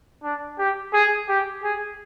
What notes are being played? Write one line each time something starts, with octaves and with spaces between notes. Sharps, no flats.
D4
G4
G#4
G4
G#4